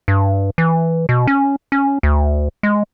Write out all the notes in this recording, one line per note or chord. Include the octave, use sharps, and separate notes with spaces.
G2
E3
B2
C#4
C#4
D2
G#3